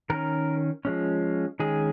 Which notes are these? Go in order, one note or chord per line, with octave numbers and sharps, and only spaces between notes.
D#3 C#4 A#4
F3 G#3 C#4
D#3 G#3 C#4 G#4